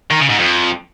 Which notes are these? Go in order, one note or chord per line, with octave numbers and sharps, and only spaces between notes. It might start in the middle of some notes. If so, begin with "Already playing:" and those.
D#3
C#3
G#2
F2